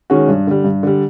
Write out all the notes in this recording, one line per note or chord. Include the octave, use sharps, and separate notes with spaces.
D#3 G#3 C#4 F#4
G2
D3 G3
G2
D3 G3